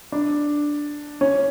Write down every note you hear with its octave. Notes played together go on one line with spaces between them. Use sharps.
D4
C#4